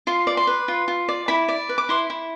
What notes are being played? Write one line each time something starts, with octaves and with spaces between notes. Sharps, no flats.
F4 C6
D5
C6
B4
F4
F4
D5
E4 B5
D5
B4
D6
E4 C6
E4